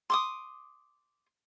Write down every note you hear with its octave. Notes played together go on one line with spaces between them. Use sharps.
C6 D6 D#6